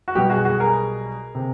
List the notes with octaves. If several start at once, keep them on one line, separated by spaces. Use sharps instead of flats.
F#4
B1 B2 G3 G4
F#4 G#4
F#4 G#4
G#4 A#4
C3